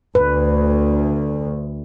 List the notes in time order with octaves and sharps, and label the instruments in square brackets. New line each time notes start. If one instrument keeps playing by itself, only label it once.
[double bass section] D2 [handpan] B4